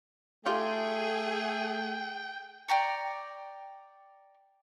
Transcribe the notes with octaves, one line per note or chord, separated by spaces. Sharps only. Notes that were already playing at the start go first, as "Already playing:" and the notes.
A3 D#4 F4 G4 G#4 G5
D5 G5 A#5 C#6